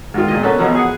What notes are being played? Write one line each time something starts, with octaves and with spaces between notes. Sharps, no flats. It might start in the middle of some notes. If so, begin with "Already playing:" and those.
G#2 D#3 F4
A#2 G#3 D#5
B3 C#4 A4 A#4
B1 B2 F3 A#5
G#4 F#5